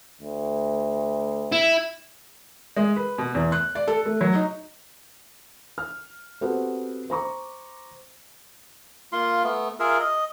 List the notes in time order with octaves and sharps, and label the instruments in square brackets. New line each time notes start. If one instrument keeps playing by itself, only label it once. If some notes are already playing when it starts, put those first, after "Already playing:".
[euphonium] D2
[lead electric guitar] E4
[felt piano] G#3
B4
B2
E2
F#6
D5
A4
A3
F#3
D#4
F6
B3 C4 F#4 G4 A4 C5
C5 A#5 C#6 D6
[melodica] A#3 F4 C6
A3 B3
F4 G#4 A#4 E5
D#5